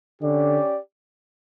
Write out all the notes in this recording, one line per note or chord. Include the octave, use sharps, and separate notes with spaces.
D3 C#4 G4 D5